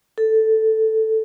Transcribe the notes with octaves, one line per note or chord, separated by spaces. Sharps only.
A4